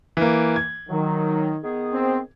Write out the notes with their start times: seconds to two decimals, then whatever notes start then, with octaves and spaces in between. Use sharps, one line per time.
0.17 E3 A#3
0.56 G#6
0.89 D#3 F#3
1.63 D#3 B3 G#4
1.93 C4